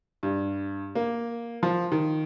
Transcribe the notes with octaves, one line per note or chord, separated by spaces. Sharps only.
G2
A#3
F3
D#3